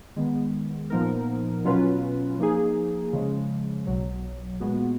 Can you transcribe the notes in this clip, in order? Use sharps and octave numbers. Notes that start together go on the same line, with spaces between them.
D#3 G#3 B3
A#2 F3 B3 D#4 A#4
B2 F#3 C#4 F4 B4
F3 A#3 D#4 G#4
C#3 F3 G#3
B1 B2 F#3
A#2 G#3 B3 F#4